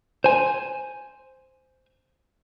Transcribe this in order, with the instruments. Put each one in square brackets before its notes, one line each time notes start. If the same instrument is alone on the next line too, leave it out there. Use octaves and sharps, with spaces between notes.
[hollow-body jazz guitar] C5 G#5